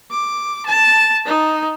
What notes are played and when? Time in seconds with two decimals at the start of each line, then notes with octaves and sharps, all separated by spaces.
0.11 D6
0.66 A5
1.26 D#4